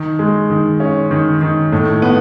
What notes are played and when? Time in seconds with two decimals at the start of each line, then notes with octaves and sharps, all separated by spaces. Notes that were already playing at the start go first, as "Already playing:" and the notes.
Already playing: D#3
0.19 G#3
0.50 D#3
0.80 C#4
1.11 D#3
1.41 D#3
1.72 A2
2.02 B3